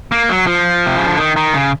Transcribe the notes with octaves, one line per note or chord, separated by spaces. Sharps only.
A#3
F#3
F3
C3
C#3
D3
D#3
D#3
C#3